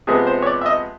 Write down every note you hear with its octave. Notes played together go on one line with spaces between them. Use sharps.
C3 F3 G#3 B3 G#4
C5
C#5
D5
E5
D#5